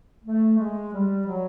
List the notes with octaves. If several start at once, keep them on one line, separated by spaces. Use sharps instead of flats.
A3
G#3
G3
F#3